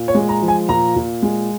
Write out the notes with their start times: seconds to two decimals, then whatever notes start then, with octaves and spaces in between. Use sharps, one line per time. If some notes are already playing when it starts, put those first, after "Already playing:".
Already playing: A#2
0.08 C#5
0.15 G#3
0.29 A#5
0.42 F3
0.48 G#5
0.69 A#2 A#5
0.96 A#2
1.23 G#3